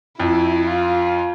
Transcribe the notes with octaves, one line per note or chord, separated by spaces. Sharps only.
F2 E4
F4